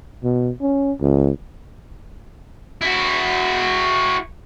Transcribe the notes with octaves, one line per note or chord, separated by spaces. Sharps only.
B2
C#4
C#2
E4 F#4